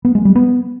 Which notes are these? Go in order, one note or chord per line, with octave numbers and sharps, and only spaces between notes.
B3
G#3
G3
B3